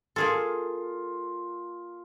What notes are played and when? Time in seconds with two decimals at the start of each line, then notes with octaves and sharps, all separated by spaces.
0.16 A#3 F4 G#4 A4